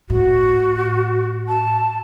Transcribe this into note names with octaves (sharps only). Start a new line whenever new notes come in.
A2 F#4
A5